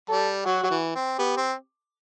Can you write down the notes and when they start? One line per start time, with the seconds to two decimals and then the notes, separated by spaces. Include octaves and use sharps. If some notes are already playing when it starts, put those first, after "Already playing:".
0.09 G3 A4
0.45 F#3 F#4
0.63 F#3
0.70 E3
0.95 C4
1.19 B3 G4
1.37 C4